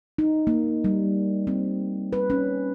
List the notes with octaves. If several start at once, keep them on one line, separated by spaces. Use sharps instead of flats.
D#4
A#3
G3
C4
B4
C#4